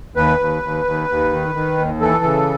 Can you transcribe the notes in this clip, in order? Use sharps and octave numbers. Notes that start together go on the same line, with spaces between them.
D#2 B4
D#2
D#2
D#2
D#2
D#3
D#3
D#2
E3 A4
C#3